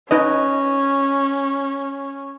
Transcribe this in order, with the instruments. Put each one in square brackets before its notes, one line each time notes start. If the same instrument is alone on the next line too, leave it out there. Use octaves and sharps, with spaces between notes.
[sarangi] C#4 [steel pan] D#4 B4 D#5